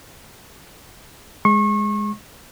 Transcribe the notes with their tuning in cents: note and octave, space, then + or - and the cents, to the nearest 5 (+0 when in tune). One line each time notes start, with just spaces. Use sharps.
G#3 +0 C#6 -35